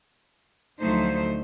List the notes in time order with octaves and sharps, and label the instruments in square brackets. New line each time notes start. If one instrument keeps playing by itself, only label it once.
[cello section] D2 F3 F#3 A3 D#4 C5